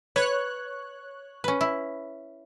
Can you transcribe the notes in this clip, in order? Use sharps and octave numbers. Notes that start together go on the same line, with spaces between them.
B4 C#5 F#6
C#4 B4
E4